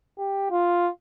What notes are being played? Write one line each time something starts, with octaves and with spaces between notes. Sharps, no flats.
G4
F4